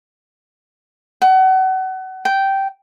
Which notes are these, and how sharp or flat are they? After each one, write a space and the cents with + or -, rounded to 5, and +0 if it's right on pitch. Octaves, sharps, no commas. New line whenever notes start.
F#5 +30
G5 -10